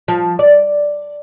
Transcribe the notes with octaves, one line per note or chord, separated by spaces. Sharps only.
F3
D5